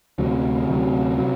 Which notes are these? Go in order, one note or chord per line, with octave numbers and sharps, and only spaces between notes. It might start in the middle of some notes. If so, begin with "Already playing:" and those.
D2 C3 F#3
D2 C3 F#3
C3 F#3